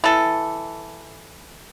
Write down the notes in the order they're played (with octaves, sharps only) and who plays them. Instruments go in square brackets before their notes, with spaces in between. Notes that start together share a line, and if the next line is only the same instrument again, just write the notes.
[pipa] E3 A4